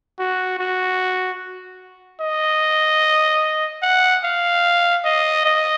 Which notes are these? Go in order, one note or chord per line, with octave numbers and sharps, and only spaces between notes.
F#4
F#4
D#5
F#5
F5
D#5
D#5